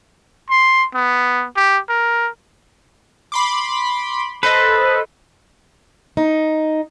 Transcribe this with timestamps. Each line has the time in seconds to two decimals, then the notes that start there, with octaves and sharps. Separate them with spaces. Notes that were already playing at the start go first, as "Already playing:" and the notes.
0.50 C6
0.95 B3
1.56 G4
1.89 A#4
3.32 B5 C6 D6
4.43 A4 B4 C5 D#5
6.17 D#4